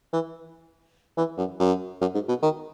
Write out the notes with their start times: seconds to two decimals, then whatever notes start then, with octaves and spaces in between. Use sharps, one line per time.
0.13 E3
1.17 E3
1.37 F#2
1.60 F#2
2.01 F#2
2.14 G#2
2.28 B2
2.42 D#3